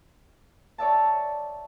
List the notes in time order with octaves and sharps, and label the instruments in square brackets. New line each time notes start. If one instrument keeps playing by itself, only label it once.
[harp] C#5 D5 E5 A5